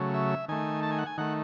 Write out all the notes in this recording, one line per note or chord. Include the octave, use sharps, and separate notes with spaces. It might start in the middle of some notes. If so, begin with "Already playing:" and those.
Already playing: C#3 F#3 A3
E5
D#3 A3 G#5
A5
G#5
F#5
G#5
D#3 A3 F#5